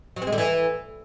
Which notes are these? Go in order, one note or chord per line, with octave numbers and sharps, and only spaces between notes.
F#3
C4
G#3
D3
E3